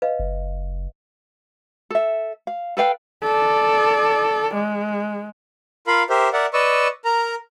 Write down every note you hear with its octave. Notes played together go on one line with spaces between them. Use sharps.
B4 D#5 F5
F#1
A4 E5
F5
A4 B4 F5 G5
A4 D5
G#3
F4 A#4 F5 B5
G4 A#4 C5 E5
A#4 D5 E5 F#5
B4 D5 D#5 C#6 E6
A#4 A#5